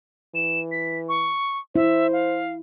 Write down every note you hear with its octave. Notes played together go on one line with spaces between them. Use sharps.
E3 E7
B6
C#6
E4 C5 E5
F5